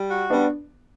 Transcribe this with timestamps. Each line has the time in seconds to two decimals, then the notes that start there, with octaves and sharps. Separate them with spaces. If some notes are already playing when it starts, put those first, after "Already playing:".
Already playing: G3
0.11 F#4
0.30 G3 B3 D4